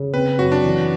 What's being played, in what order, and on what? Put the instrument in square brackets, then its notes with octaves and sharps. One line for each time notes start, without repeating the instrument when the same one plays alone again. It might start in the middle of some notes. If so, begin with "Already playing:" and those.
Already playing: [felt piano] C#3
[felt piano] C4 [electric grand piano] B4
[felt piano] F#2 [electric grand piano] F#4
[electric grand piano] D4
[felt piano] E3